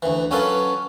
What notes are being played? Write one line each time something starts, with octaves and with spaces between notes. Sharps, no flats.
D2 E3
F#3 C#4 F4 A4 B4